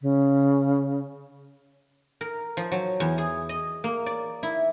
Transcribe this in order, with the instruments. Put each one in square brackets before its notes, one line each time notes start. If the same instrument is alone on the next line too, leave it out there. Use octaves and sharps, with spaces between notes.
[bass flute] C#3
[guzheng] A#4
F3
F#3
E2
G#4
D#5
A#3
D5
E4